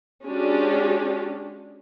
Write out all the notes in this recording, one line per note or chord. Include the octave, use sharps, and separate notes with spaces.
G#3 C#4 D4 F#4 G4